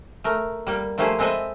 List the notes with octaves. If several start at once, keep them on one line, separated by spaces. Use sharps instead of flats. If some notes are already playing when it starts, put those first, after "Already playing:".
A3 A#4
G3 A#3 G5
F3 A3 A#3 G4 G#4 C5
G#3 C4 A4 B4 D#5 E5